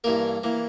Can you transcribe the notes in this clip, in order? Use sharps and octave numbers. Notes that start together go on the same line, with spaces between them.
G2 E3 A#3 A#4
E3 A#3